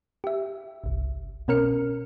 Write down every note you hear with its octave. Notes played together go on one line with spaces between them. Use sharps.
G4 E5
G1 C2
B2 C#4 A#4 F6 C#7